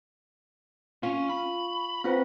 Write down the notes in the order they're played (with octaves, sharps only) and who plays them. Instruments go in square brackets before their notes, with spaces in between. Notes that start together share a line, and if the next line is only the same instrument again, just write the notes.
[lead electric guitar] C#4 [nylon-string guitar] F4 [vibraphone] C#6
[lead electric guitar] B5
[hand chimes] C4 F4 C5 [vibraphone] B4 G5 A#5